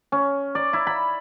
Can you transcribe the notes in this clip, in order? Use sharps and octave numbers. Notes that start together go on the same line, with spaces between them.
C#4
D5
E4
B5